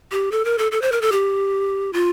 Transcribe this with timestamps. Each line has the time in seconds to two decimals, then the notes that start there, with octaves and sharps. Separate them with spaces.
0.12 G4
0.32 A4
0.45 A#4
0.58 A4
0.72 A4
0.82 C5
0.92 A#4
1.02 A4
1.12 G4
1.93 F4